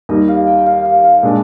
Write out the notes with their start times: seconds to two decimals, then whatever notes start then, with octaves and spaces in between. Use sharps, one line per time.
0.09 D#2 D#3 G3 D#5
0.28 F5
0.47 G5
0.66 F5
0.85 F5
1.04 F5
1.23 A#2 G#3 D4 D#5